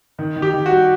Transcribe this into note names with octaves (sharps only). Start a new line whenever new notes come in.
D#3
D#3
G4
D#3
F#4
G3